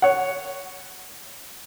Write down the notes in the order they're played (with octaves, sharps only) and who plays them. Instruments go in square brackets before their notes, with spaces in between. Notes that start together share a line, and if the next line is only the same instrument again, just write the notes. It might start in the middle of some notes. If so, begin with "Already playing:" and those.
[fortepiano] C#5 F#5